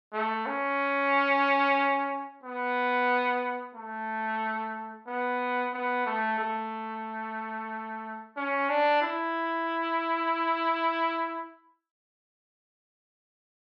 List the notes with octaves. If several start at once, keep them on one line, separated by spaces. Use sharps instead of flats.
A3
C#4
B3
A3
B3
B3
A3
A3
C#4
D4
E4